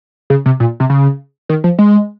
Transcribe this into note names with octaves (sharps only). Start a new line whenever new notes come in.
C#3
C3
A#2
C3
C#3
D#3
F3
G#3